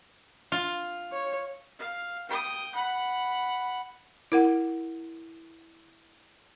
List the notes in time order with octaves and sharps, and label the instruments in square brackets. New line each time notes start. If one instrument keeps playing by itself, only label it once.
[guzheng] F4
[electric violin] C#5
[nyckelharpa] F5
G5 D#6
F#5 B5
[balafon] E4 A#4 F#5